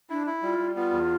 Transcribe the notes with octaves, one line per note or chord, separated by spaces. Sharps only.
D4 E4
E4
G3 F4
G3
B3 F4
E2